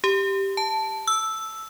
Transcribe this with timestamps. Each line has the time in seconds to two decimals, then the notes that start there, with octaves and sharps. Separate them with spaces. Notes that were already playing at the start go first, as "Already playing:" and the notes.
0.04 G4
0.57 A5
1.07 E6